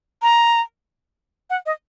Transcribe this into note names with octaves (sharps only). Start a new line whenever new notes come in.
A#5
F#5
D#5